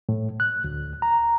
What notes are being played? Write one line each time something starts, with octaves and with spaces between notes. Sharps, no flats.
A2
F#6
D2
A#5